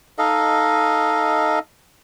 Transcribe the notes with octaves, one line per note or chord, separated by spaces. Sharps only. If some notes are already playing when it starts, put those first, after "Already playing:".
D#4 A4 D#5 F5